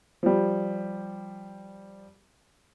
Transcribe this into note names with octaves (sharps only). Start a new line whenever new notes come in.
F3 G3